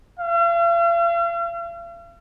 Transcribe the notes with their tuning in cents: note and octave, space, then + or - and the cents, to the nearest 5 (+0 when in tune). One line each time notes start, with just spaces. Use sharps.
F5 -45